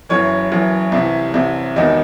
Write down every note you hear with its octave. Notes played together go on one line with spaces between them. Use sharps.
F#1 F#2 E3 C#5
F#1 F#2 E3
C2 C3 E3
C2 C3 E3
E1 E2 D#3 D#5